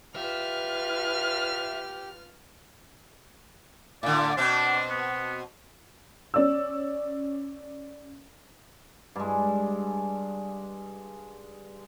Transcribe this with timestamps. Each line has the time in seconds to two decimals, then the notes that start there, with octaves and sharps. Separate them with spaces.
0.16 F4 G4 B4 E5 F6
4.03 A2 D3 D5
4.37 B2 C4 D4
4.90 B3
6.34 C#4 D5 E6
9.16 G2 G#3